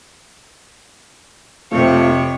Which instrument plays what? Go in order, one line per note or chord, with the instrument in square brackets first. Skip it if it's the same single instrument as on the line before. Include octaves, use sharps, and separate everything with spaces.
[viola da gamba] F2 C3 C#5 [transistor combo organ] A3 F4